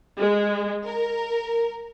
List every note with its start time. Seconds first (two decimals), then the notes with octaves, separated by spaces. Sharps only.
0.19 G#3
0.85 A#4